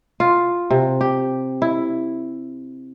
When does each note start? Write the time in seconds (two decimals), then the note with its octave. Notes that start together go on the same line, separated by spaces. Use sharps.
0.20 F4
0.71 C3
1.01 G4
1.62 E4